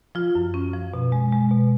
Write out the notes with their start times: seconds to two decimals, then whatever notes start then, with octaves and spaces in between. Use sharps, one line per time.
0.15 F3 F4
0.35 F#2
0.54 C#4
0.74 F3
0.94 B2
1.12 G#3
1.32 G#3
1.51 B2